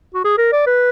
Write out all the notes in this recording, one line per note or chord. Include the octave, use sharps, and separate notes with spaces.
F#4
G#4
A#4
D5
B4